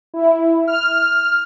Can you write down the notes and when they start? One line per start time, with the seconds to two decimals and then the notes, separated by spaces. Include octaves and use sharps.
0.14 E4
0.67 F6